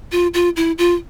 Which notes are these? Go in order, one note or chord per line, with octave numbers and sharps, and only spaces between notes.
F4
F4
E4
F4